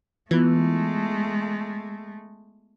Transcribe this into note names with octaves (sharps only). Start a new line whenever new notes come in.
E3 G#3 A3 B3 F4